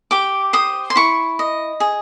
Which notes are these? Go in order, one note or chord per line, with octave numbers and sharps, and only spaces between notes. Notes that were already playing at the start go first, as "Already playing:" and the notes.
G4 D6
C5 D#6
C6
E4 C#6
D#5
G#4